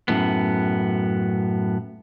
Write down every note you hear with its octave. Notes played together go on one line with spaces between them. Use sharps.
F#2 A2 B3